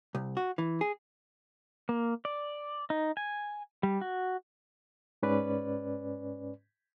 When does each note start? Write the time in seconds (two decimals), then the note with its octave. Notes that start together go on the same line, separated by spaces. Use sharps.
0.15 C2
0.37 F#4
0.58 E3
0.81 G#4
1.89 A#3
2.25 D5
2.90 D#4
3.17 G#5
3.83 G3
4.01 F#4
5.23 G#2 C#4 B4 D5